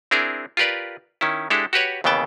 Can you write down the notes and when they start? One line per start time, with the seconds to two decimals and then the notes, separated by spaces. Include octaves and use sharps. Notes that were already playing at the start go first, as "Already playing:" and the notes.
0.11 C4 D4 E4 G#4 A#4
0.57 F4 G4 A#4 B4 D5
1.21 D#3 C#4 E4
1.50 G#3 D4 E4 G4 A4
1.73 F#4 G4 B4 C#5
2.04 D#2 C#3 E3 B3 G5 A5